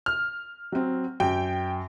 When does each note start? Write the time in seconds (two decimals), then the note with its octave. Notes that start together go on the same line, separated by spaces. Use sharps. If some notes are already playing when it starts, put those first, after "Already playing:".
0.06 F6
0.72 F#3 C4
1.20 F#2 G5